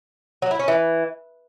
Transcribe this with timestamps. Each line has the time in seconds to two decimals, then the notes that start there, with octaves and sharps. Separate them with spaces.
0.42 F#3
0.51 E4
0.59 C#4
0.68 E3